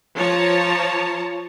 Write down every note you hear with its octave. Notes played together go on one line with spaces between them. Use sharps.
F3 C#5 A5 A#5